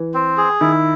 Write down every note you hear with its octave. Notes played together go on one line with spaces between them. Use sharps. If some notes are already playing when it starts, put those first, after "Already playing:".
Already playing: E3
C4
G#4
D#3 E4